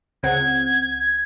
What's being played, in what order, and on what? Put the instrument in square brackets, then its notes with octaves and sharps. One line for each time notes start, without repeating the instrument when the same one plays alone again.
[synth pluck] C#2 C4 F#5 [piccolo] G#6